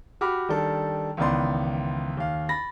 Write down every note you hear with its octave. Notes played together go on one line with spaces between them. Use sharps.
F#4 G4 B5 D6 F6
D#3 G3 D4 A4
C#2 D#3 E3 B3 D5 C6
D#2 F5
B5 A6 A#6